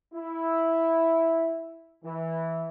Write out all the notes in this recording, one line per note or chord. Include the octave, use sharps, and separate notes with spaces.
E4
E3